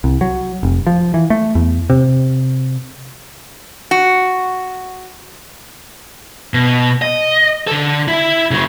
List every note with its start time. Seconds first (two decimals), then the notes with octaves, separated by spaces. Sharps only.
0.04 C2
0.21 F#3
0.63 F1
0.87 F3
1.14 E3
1.30 A3
1.55 E2
1.90 C3
3.91 F#4
6.54 B2
7.02 D#5
7.67 D3 A4
8.08 E4
8.51 C#3 F#3